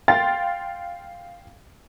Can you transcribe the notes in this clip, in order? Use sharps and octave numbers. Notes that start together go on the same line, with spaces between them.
F5 G5 C6 A6